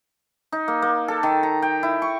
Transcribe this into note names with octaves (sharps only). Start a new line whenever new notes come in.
D#4
A#3
A#3
A4
D#3
A#5
G5
E4
C#6